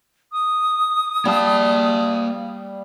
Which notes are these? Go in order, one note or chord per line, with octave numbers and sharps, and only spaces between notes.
D#6
G3 A#3 F5 A5